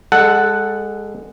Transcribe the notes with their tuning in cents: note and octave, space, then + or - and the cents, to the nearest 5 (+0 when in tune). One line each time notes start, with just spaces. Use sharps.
G#3 -25 A4 +0 F#5 +0